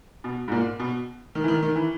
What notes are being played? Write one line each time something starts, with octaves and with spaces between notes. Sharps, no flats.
B2
G#2
A#2
B2
D#3
E3
D#3
D#3
E3